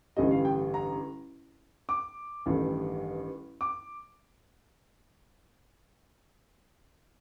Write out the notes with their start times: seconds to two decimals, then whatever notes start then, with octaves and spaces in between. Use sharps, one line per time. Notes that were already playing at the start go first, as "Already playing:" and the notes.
0.16 A1 G2 D3 G3 D#5
0.31 F5
0.45 G5
0.74 A#5
1.89 D6
2.46 A1 G2 D#3 A3
3.61 D6